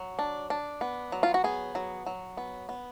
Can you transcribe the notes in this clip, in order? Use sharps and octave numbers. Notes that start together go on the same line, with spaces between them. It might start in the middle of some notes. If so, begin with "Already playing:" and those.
Already playing: F#3
D4
D4
B3
F#3
F4
F#4
B3 G#4
F#3
F#3
B3
B3